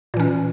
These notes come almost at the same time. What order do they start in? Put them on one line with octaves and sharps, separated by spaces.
A#2 E3 C#4